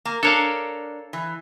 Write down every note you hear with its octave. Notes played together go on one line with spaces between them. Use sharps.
A#3
D4 A4 A#4 C#5 F5
E3